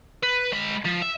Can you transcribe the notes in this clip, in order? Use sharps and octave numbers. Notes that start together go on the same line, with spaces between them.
B4
G#3 B5
F3
E5